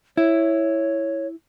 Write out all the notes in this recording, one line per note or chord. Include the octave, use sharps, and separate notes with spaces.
E4 C#5